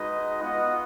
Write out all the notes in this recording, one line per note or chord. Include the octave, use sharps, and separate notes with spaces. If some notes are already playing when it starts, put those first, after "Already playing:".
Already playing: G#3 D#4 F#4 B4 D#5
B3 F4 D#5 F#5